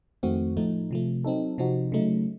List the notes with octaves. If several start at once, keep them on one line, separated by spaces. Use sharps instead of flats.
F2 D#3 A3 C4 F#4
A2 F3 A3 D#4
C3 F3 A3
F#3 C4 D#4 A4
C3 F3 C4 D#4 F#4
C#3 F#3 A3 D#4